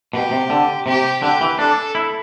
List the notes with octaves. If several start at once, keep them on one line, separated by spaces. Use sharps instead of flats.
B2 G4
C3
D3
C3 G4
D3 G4
E3
D4 A4
E4